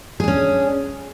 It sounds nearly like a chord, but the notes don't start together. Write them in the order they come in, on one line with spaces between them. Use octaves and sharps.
G#4 D4 C#4